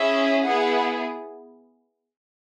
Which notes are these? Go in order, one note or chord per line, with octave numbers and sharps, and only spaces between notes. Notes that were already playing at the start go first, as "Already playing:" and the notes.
Already playing: C#4 E4 G#4 E5
B3 E4 G#4 F#5